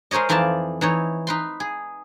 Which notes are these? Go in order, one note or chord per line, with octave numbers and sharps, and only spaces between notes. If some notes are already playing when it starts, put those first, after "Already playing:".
G#3 A#4 C5 C#5 D#5
F2 E3 D#4 F4 D5 A5
E3 D#4 C#5
D#4 B4 C6
G#4